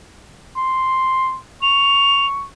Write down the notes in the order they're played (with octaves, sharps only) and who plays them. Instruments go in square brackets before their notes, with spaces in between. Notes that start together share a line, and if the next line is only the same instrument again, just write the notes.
[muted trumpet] C6
[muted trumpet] C#6 [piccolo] F7